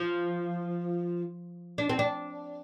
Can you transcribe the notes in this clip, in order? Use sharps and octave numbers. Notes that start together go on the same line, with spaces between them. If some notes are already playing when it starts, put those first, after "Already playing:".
Already playing: F3
D4
C4
D4